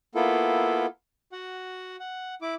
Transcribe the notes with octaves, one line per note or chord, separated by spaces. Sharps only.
A#3 B3 E4 F4 A4
F#4 F#5
F#5
E4 D6